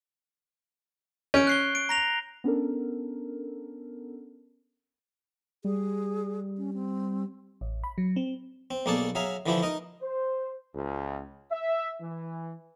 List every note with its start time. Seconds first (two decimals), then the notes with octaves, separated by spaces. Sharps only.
1.34 C#4 G6 D7
1.47 F#6 C7 G7
1.75 D7
1.89 A#5 A#6 F7
2.44 B3 C#4 D4 A4 A#4
5.64 G3 G#4
6.58 C#4
6.74 C4
7.61 A1
7.84 B5
7.98 F#3
8.16 C4
8.71 C4
8.86 B1 A#3 D4 G#4 A4 A5
9.15 F#3 G#4 E5 F5 A#5
9.46 D3 E3 F3 D4 E4 G4
9.62 D#4 A#4 D#5
10.01 C5
10.74 C#2
11.51 E5
12.01 E3